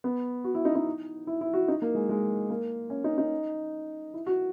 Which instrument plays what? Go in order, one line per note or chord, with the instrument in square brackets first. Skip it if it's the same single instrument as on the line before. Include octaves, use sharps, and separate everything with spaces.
[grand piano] B3
F#4
E4
D#4
D#4
E4
E4
F#4
D#4
A#3
G#3
G#3
A#3
C#4
D#4
D#4
E4
F#4